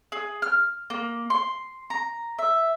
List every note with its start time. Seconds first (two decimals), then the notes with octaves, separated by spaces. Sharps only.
0.12 G#4
0.42 F6
0.90 A#3
1.30 C6
1.90 A#5
2.39 E5